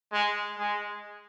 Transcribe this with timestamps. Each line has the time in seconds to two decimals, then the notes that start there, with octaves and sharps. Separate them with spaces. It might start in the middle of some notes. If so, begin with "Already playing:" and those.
0.12 G#3
0.58 G#3